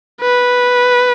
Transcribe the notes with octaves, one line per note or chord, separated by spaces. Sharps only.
B4